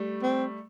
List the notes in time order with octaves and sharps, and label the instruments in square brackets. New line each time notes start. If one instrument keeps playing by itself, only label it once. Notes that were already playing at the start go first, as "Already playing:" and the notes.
Already playing: [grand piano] G3 A3
[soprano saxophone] C4